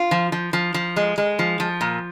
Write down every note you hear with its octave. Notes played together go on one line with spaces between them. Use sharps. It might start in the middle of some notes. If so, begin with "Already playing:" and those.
Already playing: F4
F3
F3
F3
F3
G#3
G#3
F3
F3
A#2